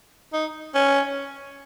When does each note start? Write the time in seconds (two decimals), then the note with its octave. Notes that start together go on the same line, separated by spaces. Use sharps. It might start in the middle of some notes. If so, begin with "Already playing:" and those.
0.33 D#4
0.75 C#4